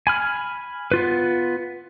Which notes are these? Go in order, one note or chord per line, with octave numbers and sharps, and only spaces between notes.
G#5 B5 F6
B3 F4 B4